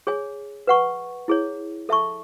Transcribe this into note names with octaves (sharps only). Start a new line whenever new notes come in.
G#4 C#5 G#5
B4 F#5 C#6
E4 G#4 C#5
A4 E5 A5 C#6